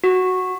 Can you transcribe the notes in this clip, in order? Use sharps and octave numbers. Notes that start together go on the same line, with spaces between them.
F#4